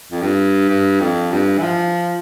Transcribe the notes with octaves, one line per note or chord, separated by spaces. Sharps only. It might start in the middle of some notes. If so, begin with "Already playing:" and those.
F2
G2
G2
F2
G2
E3
F3